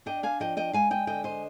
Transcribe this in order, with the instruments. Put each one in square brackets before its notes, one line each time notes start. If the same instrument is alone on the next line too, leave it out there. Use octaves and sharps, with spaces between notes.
[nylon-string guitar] D4 D#5 G5
F5 G#5
F3 D#5 G5
D#5 G5
G#3 F5 G#5
D#5 G5
D3 D#5 G5
C5 D#5